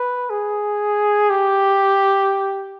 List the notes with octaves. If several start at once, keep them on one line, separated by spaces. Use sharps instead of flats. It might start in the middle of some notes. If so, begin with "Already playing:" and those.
Already playing: B4
G#4
G4